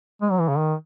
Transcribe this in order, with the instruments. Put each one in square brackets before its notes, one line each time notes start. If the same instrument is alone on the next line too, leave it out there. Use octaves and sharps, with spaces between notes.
[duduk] G#3
F#3
E3
C#3
D#3